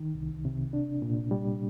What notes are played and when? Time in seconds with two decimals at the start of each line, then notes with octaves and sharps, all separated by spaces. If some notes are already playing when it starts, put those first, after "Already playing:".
Already playing: D#3
0.15 C2
0.45 C3
0.73 D4
1.02 A#2
1.31 G3